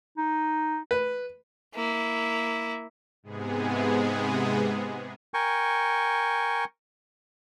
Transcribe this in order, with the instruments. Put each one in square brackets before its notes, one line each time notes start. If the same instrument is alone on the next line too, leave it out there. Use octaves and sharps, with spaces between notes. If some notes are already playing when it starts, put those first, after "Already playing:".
[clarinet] D#4
[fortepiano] B4
[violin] A#3 E4
[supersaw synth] G#2 C3 G#3 B3 G#4
[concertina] A#4 G5 G#5 C#6